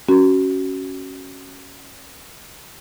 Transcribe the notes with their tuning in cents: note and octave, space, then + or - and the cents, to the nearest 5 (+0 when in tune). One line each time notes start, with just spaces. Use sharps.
C#4 +0 F#4 +20